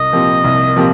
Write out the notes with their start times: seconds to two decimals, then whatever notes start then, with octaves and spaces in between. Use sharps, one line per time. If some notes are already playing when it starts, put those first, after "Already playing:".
Already playing: C2 D#5
0.12 A#2 F3 C4 G4
0.44 C2
0.76 A#2 F3 C4 G4